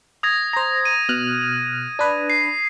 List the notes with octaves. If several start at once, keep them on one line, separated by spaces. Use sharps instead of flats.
D#6 G#6 A#6
C5 A#5
D#7
B2 F6 F#6
D4 B4
C7